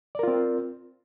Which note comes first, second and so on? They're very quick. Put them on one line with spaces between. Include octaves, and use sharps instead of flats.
D5 A#4 F4 C4